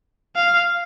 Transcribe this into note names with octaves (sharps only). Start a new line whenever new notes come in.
F5